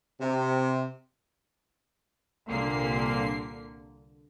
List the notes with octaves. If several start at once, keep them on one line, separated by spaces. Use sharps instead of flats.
C3
C2 A#2 D3 A#3 C7